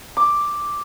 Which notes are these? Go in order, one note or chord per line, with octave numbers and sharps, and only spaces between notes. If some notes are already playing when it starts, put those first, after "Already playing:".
D6